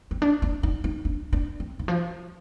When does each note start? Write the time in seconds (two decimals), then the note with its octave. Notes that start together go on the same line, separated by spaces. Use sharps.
0.11 C4
0.22 D4
0.42 D4
0.63 D#4
0.84 D#4
1.05 D4
1.33 D4
1.60 C4
1.79 D#3
1.88 F3